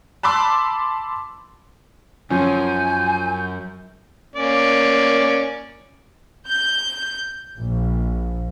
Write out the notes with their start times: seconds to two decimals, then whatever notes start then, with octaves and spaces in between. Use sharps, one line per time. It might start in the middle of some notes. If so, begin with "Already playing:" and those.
0.23 A5 B5 C6 D6 E6
2.30 F#2 F3 C#4 G#5 G6
4.36 A#3 C#4 D5
6.48 G6
7.57 A#1